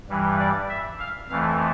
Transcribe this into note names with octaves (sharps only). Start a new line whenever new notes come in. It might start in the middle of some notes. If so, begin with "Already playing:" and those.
G2 E3 G3
D5
E5
F5
F2 E3 A3 F5